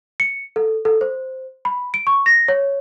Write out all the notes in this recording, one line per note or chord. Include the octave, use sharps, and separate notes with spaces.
C#7
A4
A4
C5
B5
D7
C#6
A#6
C#5